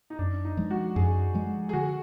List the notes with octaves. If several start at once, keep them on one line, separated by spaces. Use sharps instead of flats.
D#4
F#2 D4
D#4
F3 G#3
F#4
F#2 G#4
F3 G#3
G#4
D3 F#4